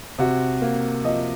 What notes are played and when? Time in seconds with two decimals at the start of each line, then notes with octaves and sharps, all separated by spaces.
0.18 C3 F#4
0.62 A#3
1.04 F3 D#5